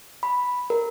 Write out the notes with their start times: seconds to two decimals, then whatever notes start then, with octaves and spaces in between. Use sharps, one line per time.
0.23 B5
0.70 A#4